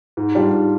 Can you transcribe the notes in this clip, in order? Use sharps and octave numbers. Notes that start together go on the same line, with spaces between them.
G#2
G3 D4 F4
G#2